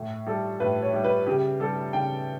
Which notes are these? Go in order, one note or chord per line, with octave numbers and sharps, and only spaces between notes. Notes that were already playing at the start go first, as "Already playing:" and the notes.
Already playing: A2
G3 A4
A2 B4
C#5
G3
B4
C#3 G4
G3 A4
C#3 G5